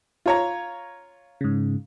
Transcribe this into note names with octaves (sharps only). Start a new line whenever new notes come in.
F4 C#5 A#5
G#2 C#3